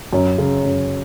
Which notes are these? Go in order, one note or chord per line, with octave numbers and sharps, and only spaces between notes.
F#2
C#3
F#2